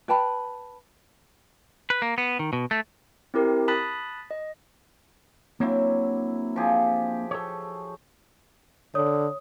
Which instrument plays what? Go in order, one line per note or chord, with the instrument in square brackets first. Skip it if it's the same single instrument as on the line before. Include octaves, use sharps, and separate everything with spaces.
[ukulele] B4 G5 A5 B5
[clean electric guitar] B4
A#3
B3
D#3
B2
A3
[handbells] C4 E4 G4 A#4
A5 B5 D#6 F#6 A6 B6
D#5
[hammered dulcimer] F#3 E4 [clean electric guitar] A#3 C4 D4
[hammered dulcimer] F3 G4 G#4
[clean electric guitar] A4 C#5
[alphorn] D3 [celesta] C#5 D#6